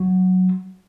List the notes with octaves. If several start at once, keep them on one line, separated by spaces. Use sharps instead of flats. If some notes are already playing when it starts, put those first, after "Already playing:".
Already playing: F#3